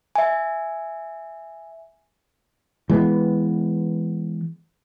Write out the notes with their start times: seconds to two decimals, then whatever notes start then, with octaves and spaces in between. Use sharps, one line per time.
0.15 E5 G#5
2.90 E3 G#3 B3